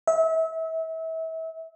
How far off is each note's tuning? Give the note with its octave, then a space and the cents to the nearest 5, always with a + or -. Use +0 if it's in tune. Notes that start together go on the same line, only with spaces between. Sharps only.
E5 -30